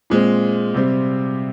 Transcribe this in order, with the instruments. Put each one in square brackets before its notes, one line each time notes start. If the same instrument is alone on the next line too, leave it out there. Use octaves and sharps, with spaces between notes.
[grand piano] A#2 G#3 C4
C3 G3 C4